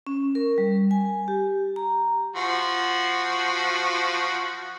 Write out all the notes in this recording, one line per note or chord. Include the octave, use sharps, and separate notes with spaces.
C#4
A#4
G3
G#5
G4
A#5
F3 F#4